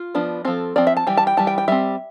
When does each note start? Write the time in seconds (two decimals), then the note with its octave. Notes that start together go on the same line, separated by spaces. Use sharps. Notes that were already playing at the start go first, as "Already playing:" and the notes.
Already playing: F4
0.15 F3 B3 D4
0.45 F3 C4 A4
0.76 F3 C4 D5
0.87 E5
0.97 A5
1.07 E3 G3 G5
1.17 A5
1.27 G5
1.37 E3 G3 A5
1.47 G5
1.58 G5
1.68 G3 C4 E5